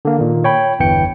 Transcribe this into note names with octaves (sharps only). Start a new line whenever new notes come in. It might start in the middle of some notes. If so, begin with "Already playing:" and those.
D3 A#3
A#2 D#3
C#5 G5 B5
G1 E2 E3 G5 C#7